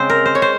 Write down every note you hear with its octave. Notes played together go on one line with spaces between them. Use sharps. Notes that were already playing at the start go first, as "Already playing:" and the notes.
Already playing: C#3 G#3 C4 C5
A#4
C5
C#5
C5